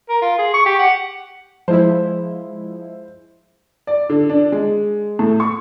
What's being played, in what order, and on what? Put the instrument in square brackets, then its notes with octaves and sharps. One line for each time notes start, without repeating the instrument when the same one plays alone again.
[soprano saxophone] A#4
F4
G#4
C#6
G4
F#5
[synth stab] F3 G#3 E4 [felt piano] C5
[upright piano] D5
D3
D4
G#3
A2
C#6